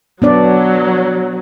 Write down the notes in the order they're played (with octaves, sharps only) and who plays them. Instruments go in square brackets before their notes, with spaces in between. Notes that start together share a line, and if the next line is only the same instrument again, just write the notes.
[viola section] F#3 [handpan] B3 D4 D5